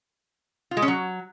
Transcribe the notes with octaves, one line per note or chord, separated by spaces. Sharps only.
F4
G#3
C#4
F#3